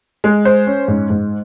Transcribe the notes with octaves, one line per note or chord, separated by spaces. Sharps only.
G#3
C5
C#4
G#2
G#2